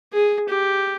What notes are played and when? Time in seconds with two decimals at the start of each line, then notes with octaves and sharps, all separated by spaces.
0.13 G#4
0.49 G4